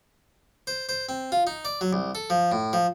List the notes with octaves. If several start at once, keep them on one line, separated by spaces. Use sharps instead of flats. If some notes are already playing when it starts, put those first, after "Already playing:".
C5
C5
C4
F4
D#4
D5
F#3
C2
A4
F3
A2
F3